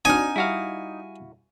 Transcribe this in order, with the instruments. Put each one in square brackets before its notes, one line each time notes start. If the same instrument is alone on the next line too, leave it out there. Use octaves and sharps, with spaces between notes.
[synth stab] C4 D4 F#4 [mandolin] D#4 F6 [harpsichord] G#5
[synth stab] G3 [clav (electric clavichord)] E4 F#4 F5